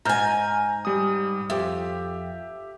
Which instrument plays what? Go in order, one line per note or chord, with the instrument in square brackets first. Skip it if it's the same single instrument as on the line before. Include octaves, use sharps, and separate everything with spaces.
[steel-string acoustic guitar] G#2 G#5 [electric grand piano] A#5 F6 G6
[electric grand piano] G3 D#6
[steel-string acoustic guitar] F2 [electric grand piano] G4 E5